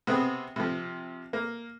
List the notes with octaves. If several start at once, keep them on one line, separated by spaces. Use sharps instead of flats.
C3 B3 C4 G#4
C3 F3
A#3